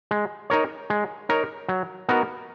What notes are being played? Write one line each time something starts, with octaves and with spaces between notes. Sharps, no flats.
G#3
D#4 A#4 C#5
G#3
D#4 A#4 C#5
F#3
B3 D#4 F#4 A#4